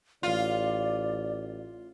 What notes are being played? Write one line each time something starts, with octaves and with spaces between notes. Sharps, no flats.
A1 F4 D5